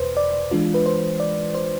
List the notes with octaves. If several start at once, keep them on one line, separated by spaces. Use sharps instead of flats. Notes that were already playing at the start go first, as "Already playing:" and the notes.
Already playing: E2 B2 B4 C5
D5
E3 G#3 D4 F4
B4
C5
D5
C5